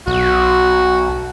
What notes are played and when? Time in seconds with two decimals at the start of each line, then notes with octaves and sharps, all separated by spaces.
0.07 B1 F#4